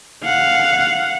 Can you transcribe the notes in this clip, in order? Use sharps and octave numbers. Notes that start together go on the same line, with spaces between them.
F5 F#5